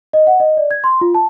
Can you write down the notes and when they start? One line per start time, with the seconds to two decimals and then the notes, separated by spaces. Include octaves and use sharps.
0.13 D#5
0.27 F#5
0.40 D#5
0.57 D5
0.71 G#6
0.84 C6
1.01 F4
1.14 A5